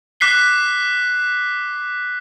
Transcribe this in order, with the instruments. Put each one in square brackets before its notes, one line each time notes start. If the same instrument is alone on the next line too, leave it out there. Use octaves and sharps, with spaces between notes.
[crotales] D6 F#6 B6 C7 G7